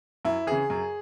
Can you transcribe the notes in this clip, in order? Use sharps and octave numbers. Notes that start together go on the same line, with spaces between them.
F#2 E4
C#3 E3 G#4
F#2